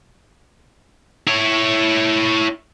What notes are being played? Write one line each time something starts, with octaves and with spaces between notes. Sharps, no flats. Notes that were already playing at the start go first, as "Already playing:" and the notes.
E4 C#5